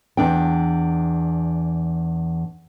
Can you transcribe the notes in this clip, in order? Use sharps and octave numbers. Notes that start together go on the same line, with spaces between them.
E2 D4 G5